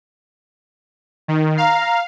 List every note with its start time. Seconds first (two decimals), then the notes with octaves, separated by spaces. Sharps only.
1.28 D#3
1.57 F5 A#5